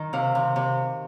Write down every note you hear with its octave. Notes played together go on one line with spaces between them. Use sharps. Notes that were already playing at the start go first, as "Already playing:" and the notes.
Already playing: D#3
C3 F5
C3
C3